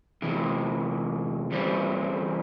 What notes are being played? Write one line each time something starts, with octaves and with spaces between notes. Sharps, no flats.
E2 C3 E3
E2 E3 G3 C4